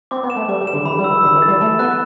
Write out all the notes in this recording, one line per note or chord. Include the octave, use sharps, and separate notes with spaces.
C4 D6
B3
E7
A3
G3 D6
G3
E7
D3
E3 B5
G3
E6
E3
D3 B5
E3
A6
G3
A3 E7
B3 F#6